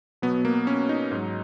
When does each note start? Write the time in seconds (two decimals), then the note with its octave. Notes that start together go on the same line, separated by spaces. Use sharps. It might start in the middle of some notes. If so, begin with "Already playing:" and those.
0.22 B2 F#3 B3
0.45 A#3
0.67 C#4
0.89 D#4
1.12 G#2 F#3